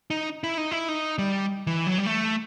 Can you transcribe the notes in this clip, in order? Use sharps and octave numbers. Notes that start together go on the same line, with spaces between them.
D#4
E4
D#4
E4
D#4
G3
E3
F#3
G3
A3